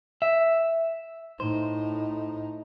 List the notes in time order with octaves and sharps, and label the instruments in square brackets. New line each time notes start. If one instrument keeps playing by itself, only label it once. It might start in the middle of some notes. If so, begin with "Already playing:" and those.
[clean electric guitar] E5
[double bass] A2 D#4 [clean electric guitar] C5